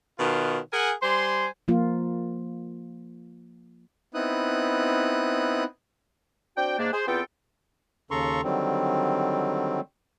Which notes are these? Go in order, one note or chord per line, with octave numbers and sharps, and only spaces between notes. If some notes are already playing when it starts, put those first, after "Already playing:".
B2 D#3 F#3 F4
G#4 A#4 F#5 G#5
G3 C5 G#5 C6
F3 A#3 F4
B3 C4 D#4 E4 D#6 F#6
C4 D4 F#4 G5
G#2 A#3 D4
G#4 C5
E2 B3 C4 F4 A4 G5
D#2 C#3 A4 A#5 C6 C#6
D3 D#3 F#3 G3 C4